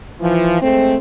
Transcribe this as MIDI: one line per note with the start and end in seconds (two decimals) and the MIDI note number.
0.20 0.58 52
0.20 0.58 53
0.61 0.96 56
0.61 0.96 57
0.61 0.96 60